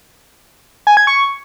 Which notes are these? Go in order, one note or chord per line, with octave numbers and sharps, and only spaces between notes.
G#5
G#6
C#6